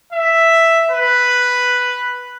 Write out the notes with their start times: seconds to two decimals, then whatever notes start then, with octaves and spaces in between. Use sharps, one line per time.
0.13 E5
0.92 B4